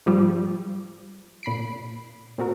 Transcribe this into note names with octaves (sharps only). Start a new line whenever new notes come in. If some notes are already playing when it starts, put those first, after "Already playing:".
G#2 F3 G3
A#2 B5 C7 D7
A#2 C4 F#4 A#4